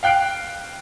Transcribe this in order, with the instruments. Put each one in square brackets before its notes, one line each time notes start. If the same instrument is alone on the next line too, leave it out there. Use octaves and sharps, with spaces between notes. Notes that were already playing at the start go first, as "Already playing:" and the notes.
[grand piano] F5 G5 F#6 C7 D7